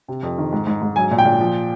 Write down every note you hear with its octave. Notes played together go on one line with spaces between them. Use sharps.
C3
F2
D#3
G#2
G#2
G#2
F#3 G#5
A#2
G5
A#2
F3